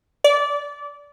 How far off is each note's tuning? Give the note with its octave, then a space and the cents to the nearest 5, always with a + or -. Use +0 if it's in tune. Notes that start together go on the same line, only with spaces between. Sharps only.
D5 -20